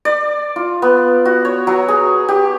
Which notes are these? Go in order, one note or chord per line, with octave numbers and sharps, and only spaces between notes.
D5
F4
B3
F#4
C#5
F#3
G#4
G4